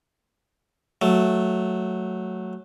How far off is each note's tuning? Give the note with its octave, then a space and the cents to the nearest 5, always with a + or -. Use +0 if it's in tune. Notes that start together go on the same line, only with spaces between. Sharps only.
F#3 +0 A3 +0